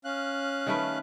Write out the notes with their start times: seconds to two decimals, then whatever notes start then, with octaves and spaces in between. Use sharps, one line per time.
0.05 C#4 F5 F#6
0.67 D#3 A3 B4